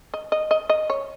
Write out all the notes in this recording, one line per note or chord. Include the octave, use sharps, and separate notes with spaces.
D#5
D#5
D#5
D#5
C#5